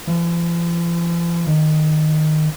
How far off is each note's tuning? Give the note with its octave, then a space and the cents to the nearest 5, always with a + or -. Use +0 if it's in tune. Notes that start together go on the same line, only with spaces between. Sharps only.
F3 -45
D#3 -10